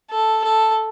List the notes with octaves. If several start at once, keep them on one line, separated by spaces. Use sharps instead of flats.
A4
A4